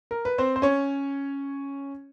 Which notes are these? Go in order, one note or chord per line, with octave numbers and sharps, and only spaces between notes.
A#4
B4
C4 C5
C5
C#4 C#5